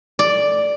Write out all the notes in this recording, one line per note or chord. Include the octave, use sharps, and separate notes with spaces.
D5